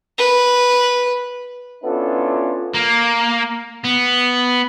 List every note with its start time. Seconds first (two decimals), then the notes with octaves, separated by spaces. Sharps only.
0.18 B4
1.84 B3 C#4 D4 E4 F4 A4
2.74 A#3
3.85 B3